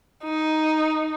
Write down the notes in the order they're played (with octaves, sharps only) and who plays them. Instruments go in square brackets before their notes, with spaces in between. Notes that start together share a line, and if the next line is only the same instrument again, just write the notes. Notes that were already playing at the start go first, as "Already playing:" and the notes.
[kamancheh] D#4